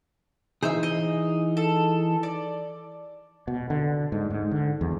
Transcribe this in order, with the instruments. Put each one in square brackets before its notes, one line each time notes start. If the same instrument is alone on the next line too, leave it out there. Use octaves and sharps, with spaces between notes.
[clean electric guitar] E3 D#4 G#4 [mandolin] C5 E5 E6
[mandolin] D#5
A4
D5
[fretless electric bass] B2
D3
G#2
G#2
D3
E2